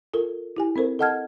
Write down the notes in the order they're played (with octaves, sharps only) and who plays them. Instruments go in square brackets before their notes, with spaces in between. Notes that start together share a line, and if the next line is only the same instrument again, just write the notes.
[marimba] F4 A4 A#4
E4 G4 G#5
C4 A4 A#4 C5
A4 D#5 F#5 A5 F6 G#6